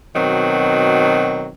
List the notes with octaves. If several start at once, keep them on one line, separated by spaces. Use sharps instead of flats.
B2 D#3 F#3 C4